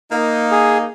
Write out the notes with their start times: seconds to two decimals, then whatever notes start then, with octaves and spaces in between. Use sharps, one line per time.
0.11 A#3 D#4
0.52 G#4